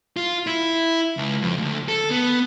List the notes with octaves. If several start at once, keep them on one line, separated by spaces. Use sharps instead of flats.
F4
E4
C#2
F2
D2
A4
B3